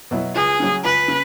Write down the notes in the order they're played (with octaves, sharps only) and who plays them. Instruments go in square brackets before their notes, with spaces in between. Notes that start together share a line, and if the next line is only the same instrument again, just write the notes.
[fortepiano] B2 F#3 E4
[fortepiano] C#2 [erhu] G#4
[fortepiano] C#3 F#3 C#4
[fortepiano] C#2 [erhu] B4
[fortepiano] C#3